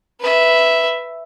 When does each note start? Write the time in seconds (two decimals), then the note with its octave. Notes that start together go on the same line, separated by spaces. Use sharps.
0.20 B4 E5